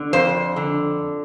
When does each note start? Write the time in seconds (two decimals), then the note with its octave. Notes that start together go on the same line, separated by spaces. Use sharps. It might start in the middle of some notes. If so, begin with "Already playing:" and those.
Already playing: D3
0.13 F2 C5
0.56 D3